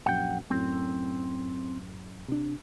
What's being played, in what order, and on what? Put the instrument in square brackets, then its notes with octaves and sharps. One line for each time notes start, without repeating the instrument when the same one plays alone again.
[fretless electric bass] A#1 F#2 [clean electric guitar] F#5 G5
[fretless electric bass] F#2 A2 [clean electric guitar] C4
[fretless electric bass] C3 D4